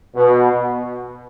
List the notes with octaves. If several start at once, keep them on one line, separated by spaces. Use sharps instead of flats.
B2